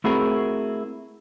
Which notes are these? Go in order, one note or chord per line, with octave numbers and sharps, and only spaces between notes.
A3 C4 E4 F#4 G#4 A#4